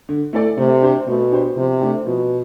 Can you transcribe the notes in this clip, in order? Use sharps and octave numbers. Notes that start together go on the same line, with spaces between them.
D3
A3 E4 A4 D5
C3 A3
D4 G4 C5
B2 A3
D4 G4 C5
C3 F3
A3 D4 G4
B2 F3